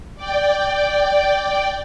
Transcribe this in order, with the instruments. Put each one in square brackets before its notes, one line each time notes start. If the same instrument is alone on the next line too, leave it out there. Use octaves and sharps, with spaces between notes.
[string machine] D5 G5